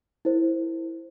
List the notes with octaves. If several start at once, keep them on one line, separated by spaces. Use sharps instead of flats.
E4 A#4 C5